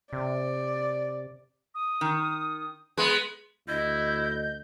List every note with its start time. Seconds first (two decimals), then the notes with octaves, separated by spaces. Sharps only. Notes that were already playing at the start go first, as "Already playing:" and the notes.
0.13 C3 D5
1.75 D#6
2.01 D#3
2.97 G#3 B3 B4
3.68 D2 E4 D#5 G6